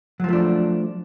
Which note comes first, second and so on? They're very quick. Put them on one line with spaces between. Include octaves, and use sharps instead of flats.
F#3 F3 A3 D4